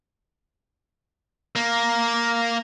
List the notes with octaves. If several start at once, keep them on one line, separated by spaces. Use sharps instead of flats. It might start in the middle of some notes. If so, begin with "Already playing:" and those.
A#3